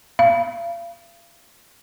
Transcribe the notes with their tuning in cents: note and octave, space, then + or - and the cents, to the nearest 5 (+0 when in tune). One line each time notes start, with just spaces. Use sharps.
F5 -40